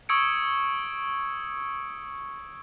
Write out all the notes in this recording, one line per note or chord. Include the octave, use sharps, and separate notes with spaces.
C#6 D#6 E6 G#6 C#7 D7